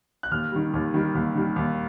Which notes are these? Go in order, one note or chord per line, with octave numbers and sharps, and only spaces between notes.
F#6
D#2 F6
D#3 G3
D#2
D#3 G3
D#2
D#3 G3
D#2